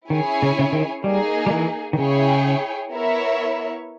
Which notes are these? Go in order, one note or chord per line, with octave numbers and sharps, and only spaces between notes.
D#3 C#4 E4 G#4 C#5 G#5
C#3
C#3
D#3
G3 A#3 D#4 G#4
G3
E3
D#3
C#3 E4 G#4 C#5 G5
B3 E4 A#4 C#5 E5